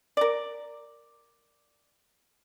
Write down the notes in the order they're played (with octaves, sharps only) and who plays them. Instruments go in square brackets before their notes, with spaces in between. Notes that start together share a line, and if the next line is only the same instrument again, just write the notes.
[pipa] A#4 D5